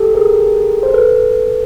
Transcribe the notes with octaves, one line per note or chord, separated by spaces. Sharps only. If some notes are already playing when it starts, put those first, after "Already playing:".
Already playing: G4 A4
G#4 A#4
C5
A4 B4